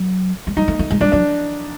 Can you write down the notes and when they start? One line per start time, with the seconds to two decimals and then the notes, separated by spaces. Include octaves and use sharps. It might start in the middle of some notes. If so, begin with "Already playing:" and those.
Already playing: F#3
0.47 G#3
0.57 G3 D#4
0.68 A3
0.79 A3
0.90 G#3
1.01 G3 D4
1.12 F#3 D4